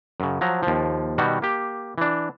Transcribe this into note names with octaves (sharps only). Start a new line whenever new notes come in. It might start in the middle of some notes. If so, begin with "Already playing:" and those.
F#2 C#3
F3 F#3 A#5
D#2 F3
B2 D#3 G3 F#4
A#3 G4
E3 D4